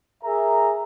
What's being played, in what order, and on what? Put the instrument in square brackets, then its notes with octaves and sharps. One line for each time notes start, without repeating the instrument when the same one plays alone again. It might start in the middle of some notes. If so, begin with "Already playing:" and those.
[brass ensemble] G#4 A#4 E5 A#5